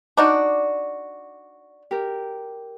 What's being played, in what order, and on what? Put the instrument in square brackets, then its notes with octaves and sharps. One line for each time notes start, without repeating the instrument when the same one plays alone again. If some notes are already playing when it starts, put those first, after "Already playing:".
[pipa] D4 D#4 F#4 [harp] D5
[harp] G4 A#4